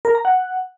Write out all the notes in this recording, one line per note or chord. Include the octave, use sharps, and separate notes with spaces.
A#4
A#5
F#5